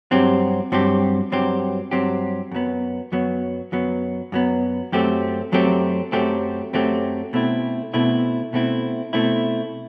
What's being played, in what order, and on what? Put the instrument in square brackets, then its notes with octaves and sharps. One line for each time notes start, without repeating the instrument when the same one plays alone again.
[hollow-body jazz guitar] G2 F#3 C4 G4
G2 F#3 C4 G4
G2 F#3 C4 G4
G2 F#3 C4 G4
F#2 F#3 B3
F#2 F#3 B3
F#2 F#3 B3
F#2 F#3 B3
F#2 F#3 A3 C4 G4
F#2 F#3 A3 C4 G4
F#2 F#3 A3 C4 G4
F#2 F#3 A3 C4 G4
B2 A3 C4 E4
B2 A3 C4 E4
B2 A3 C4 E4
B2 A3 C4 E4